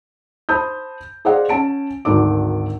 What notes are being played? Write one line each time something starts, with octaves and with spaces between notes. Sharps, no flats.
C5 A5 B5 D#6 G6
G#4 C5 D5 D#5 F5 F#5
C#4 F#5 A5 D7
G#1 D2 D#3 D4 D6